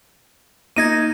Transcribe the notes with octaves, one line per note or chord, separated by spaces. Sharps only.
A#3 D#4 G#6 A#6 D#7